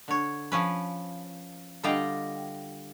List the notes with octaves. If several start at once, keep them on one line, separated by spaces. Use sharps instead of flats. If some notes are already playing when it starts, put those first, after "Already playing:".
D3 C#5
F3 C#4 B4
D3 G3 F4 D#5 F5 G5